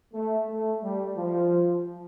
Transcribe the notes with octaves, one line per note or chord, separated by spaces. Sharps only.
A3
A3
G3
F3